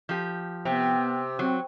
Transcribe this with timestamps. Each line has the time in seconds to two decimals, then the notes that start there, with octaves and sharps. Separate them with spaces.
0.09 F3 G4
0.65 C3 B3
1.39 F#3 C4